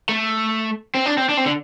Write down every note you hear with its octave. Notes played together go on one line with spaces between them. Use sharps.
A3
C4
D4
C4
D4
C4
D3